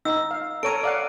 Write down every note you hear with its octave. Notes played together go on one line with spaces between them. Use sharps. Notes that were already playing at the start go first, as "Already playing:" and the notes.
D#4 E6
F5
A4 C#5 A#5 D7 D#7
D5 F5 F#5